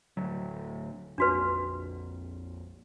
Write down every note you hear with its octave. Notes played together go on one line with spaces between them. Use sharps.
D1 D2 F#3
A#1 F2 D4 F#4 B4